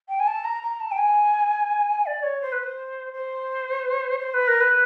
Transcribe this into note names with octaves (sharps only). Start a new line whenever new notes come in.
G5
G#5
A5
A#5
A#5
A5
G5
G#5
D5
C#5
C5
B4
C5
C5
C5
B4
A#4
B4